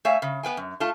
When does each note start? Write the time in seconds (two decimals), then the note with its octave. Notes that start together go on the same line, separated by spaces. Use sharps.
0.05 A3 C#5 E5 F5 G#5
0.22 C#3
0.43 B3 B4 G5 G#5
0.57 F#2
0.80 A3 F4 A5